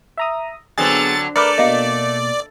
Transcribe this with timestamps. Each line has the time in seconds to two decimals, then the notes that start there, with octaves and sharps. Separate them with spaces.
0.17 E5 A#5 D#6
0.78 D3 F#3 B3 C4 G#4 A6
1.36 A3 A#4 B4 D5 D6 F6 C#7
1.58 B2 A#3 D#5 F5